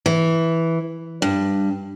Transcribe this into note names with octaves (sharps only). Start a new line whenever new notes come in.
E3
G2